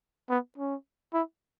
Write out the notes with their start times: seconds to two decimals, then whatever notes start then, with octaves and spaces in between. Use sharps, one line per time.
0.30 B3
0.58 C#4
1.14 E4